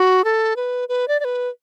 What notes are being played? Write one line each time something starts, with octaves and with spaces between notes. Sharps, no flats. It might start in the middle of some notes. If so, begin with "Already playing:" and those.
Already playing: F#4
A4
B4
B4
D5
D5
B4